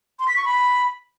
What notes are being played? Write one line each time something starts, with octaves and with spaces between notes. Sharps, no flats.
C6
B6
C#6
B5